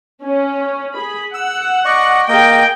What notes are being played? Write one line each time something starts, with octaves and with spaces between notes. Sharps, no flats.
C#4
G#4 B5
F#5 E6
D5 D#5 C#6
A#3 G#4 D#5 G5